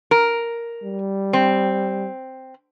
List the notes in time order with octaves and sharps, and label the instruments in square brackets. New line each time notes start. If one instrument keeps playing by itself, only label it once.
[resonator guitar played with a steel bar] A#4
[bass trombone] G3
[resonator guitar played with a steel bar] C4